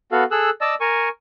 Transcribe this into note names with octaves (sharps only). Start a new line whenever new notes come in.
B3 F#4 A4 F5
G#4 A4 E6 F#6
D5 D#5 A5 E6
A#4 G#5 C#6